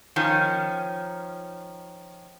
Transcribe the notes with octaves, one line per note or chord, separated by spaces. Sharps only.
D#3 F3 C#4